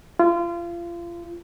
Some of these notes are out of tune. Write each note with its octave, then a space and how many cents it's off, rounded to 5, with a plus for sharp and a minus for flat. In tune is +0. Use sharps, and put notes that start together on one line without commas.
F4 -30